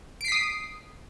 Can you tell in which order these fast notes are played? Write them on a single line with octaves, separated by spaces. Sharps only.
D7 C7 B6 D#6